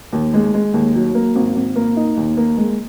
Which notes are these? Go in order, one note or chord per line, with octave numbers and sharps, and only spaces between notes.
D#2
G#3
G#3
D#2
F#3
A#3
G#1
G#1
A#3
D#4
D#2
A#3
G#3